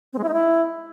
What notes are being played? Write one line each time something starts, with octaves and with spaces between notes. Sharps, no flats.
C4
G#3
E4
D#4
E4